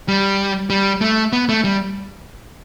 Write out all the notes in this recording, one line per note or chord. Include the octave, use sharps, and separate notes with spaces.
G3
G3
A3
B3
A3
G3